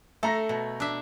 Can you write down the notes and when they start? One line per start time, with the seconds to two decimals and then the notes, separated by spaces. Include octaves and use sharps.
0.23 A3 A4 A#5 A#6
0.49 B2
0.80 D4 E5